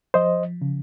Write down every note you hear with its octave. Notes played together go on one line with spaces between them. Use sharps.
F3 C5 D#5
C#3